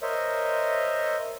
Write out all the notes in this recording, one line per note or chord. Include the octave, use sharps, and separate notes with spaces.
A#4 C5 C#5 D#5 E5